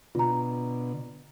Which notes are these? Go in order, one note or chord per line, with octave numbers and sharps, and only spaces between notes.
B2 D3 F4 A#5